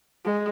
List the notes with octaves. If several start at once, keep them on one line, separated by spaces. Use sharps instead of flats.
G#3